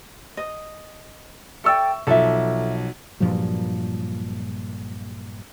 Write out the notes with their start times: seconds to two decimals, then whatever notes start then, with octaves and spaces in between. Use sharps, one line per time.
0.37 D#5
1.64 A4 D5 E5 G5 C#6 E6
2.07 B1 F3 A4 E5
3.20 G2 A#2 F3 F#3